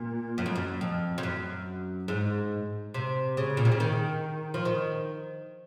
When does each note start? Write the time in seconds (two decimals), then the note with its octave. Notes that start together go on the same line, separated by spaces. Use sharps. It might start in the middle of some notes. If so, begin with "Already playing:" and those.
Already playing: A#2
0.38 F#2
0.46 F2
0.56 F#2
0.81 F2
1.18 F2
1.23 F#2
2.08 G#2
2.94 C3
3.37 C#3
3.57 A#2
3.65 C3
3.72 C#3
3.80 D#3
4.54 F3
4.65 D#3